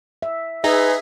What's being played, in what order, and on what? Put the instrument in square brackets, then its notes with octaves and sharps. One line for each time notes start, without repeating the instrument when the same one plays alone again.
[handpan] E5
[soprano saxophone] D#4 [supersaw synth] G#4 [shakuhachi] B4 [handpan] E5